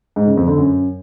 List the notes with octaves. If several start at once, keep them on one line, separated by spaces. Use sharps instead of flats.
G#2
C#3
F2
D3
F#2